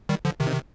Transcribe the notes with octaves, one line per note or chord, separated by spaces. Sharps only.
D#3 G3
D3 F3
C3 D#3